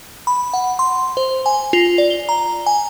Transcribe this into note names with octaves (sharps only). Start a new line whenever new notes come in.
B5
F#5
C6
C5
G#5
F4
D5
G7
A#5
G#5